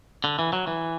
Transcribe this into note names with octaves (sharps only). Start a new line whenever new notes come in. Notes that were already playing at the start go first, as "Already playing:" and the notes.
D3
E3
F#3
E3